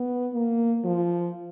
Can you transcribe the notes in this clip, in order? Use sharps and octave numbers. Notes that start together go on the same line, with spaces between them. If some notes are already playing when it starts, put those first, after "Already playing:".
Already playing: B3
A#3
F3